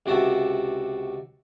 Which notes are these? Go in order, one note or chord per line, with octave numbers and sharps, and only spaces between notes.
C#2 C3 F#4 E5 A5